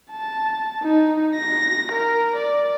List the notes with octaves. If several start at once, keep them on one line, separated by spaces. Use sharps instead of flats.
A5
D#4
A#6
A#4
D5